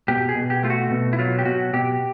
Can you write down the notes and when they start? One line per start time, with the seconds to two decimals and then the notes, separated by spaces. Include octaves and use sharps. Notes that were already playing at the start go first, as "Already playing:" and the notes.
0.08 B2 G4
0.29 G#4
0.35 B2
0.50 G4
0.63 A3 F4
0.70 F#4
0.91 B2
1.13 E4
1.19 F#3 F4
1.39 G4
1.45 B2 F#4
1.73 B2 G4